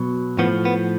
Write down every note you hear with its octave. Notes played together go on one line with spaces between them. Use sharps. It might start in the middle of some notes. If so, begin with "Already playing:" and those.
Already playing: B2 F#3
A2 F3 B3
B3